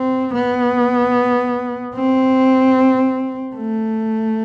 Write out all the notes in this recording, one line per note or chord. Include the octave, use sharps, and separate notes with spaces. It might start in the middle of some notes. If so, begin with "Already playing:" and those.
Already playing: C4
B3
C4
A3